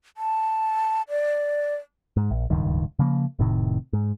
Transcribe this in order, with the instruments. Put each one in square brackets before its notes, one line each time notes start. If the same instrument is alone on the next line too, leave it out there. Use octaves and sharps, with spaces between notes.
[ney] A5
D5
[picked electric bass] G#2
A#1
D1 C#2 G2 D#3
C#3 F3 A#3
F1 A2 C3 D#3
G#2